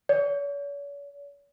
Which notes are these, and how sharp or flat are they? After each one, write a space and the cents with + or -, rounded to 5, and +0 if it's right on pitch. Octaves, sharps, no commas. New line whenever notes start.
C#5 +45